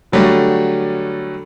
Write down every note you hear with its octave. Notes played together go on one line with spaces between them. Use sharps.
D3 F#3 G3 A3